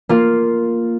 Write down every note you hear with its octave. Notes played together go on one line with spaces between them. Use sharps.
A#3 F4